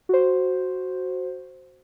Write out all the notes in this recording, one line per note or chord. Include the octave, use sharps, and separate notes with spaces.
F#4 C5